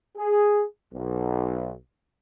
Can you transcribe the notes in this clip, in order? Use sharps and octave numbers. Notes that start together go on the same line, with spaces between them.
G#4
B1